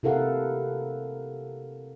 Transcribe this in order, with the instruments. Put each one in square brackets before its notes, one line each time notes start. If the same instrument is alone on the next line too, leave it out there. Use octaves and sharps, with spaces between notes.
[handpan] C3 E4 A4 A#4 F5 F#5